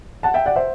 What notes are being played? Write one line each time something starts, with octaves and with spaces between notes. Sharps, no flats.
F#5 A5
E5 G5
D5 F#5
C5 E5